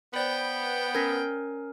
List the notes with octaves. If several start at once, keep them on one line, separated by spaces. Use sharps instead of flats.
B3 C5 D5 G5 B5
C#4 A#4 G#6 A#6 B6